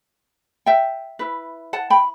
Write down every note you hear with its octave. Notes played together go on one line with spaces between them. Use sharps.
E5 G5
E4 B4
F#5 A5
G5 B5